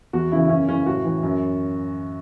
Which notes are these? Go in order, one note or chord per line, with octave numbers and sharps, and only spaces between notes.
E2 F#4
C#3 E3 E4
E4
F#2 C#4
C#3 E3 C#4
A2 F#4
E3
F#2